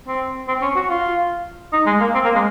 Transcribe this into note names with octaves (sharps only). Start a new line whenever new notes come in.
C4
C4
C#4
F#4
F4
D#4
G#3
A#3
C4
A#3
G#3